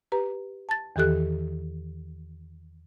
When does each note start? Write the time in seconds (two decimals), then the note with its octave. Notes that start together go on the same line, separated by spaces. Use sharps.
0.12 G4 B4 A#5
0.69 A5 A6
0.96 E2 D#3 E3 G4 A4 F#6